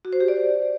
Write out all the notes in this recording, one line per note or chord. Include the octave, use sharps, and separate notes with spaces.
F#4
C5
G4
D5